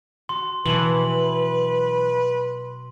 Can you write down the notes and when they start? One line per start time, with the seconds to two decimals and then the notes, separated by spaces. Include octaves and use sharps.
0.29 F#4 C6
0.66 B2 E3 F#3 B4 F#7